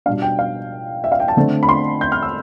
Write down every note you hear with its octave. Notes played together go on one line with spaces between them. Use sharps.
B2 G3 D4 F5
G5
F5
E5
F5
G5
A5
D3 A3 C4
B5
C6
G6
F6
E6